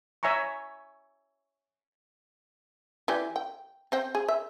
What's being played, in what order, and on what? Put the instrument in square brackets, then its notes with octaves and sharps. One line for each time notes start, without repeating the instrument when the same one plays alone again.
[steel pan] C#5 E5 G#5 A#5 C#6
[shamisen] E3 G4 D5
G5
C4 C5 G5
G#4
E5